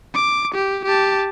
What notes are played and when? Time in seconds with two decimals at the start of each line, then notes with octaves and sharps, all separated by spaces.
0.14 D6
0.55 G4
0.85 G4 A5